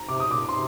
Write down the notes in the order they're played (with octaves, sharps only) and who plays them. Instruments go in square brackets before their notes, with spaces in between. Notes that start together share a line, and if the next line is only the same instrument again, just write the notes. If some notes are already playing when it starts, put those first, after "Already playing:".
Already playing: [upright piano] A#5
[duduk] C3 [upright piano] D6
[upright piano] D#6
[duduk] A#2 [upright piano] D6
[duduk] C3 [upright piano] C6